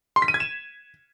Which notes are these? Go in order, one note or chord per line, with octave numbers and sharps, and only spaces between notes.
C6
B6
D#7
G#6
E7